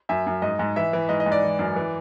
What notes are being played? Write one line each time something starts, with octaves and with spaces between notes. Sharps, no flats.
F#2 E5
F#2
G#2 D#5
G#2
E3 E5
E3
G#2 D#5
D#5
G#2
D5
E3
F#2
E3